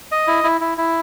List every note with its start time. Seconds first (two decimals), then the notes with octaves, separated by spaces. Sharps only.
0.12 D#5
0.27 E4
0.44 E4
0.61 E4
0.78 E4